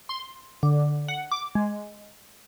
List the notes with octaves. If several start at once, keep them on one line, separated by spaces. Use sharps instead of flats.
C6
D3
F#5
D6
G#3